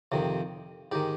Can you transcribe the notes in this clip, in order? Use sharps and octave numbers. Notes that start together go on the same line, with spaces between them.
F2 C3 D#3
G#2 D#3 G4